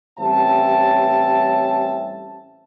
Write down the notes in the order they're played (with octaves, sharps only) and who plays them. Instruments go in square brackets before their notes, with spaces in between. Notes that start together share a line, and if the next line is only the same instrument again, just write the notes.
[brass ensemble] A1 G3 C4 C#4 E5 A5